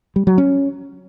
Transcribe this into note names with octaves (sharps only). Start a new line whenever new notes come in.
G3
F#3
C#4